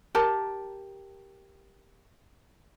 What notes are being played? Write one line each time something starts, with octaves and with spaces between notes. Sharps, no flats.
G4 A#4 A5